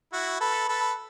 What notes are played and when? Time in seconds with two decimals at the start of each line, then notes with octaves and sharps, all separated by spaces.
0.13 E4 F#4
0.41 A4 B4
0.69 A4 B4